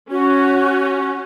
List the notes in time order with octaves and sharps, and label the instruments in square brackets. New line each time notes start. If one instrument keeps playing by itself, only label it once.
[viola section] C#4 [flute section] F#4